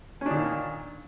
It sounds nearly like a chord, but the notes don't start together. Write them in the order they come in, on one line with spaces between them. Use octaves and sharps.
C#4 D4 D#3 A#2